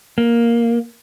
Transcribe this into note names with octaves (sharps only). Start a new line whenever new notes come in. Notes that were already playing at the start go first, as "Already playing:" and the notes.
A#3